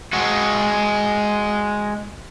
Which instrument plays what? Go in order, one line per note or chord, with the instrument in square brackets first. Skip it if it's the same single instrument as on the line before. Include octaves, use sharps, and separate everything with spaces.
[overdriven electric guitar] G#3 F#4